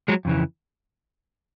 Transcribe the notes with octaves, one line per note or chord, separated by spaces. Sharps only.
F#3 G#3
F2 C#3 E3